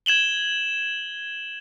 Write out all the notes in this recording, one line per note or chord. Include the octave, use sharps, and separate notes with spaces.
G#6 E7 F#7 G7